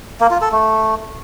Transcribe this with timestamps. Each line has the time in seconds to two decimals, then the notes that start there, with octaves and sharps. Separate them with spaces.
0.20 A#3
0.31 F4
0.41 A4
0.52 A3